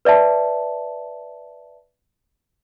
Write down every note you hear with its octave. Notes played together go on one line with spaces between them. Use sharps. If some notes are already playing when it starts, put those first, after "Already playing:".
B4 D5 E5 A5